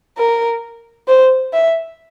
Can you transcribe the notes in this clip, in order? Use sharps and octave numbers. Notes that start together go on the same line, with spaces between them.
A#4
C5
E5